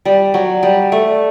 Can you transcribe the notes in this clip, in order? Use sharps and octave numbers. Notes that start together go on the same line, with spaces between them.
G3
F#3
G3
A3